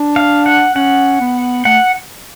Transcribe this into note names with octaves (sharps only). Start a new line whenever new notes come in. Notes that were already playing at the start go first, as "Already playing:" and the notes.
Already playing: D4
F5
F#5
C#4 F#5
B3
A3 F#5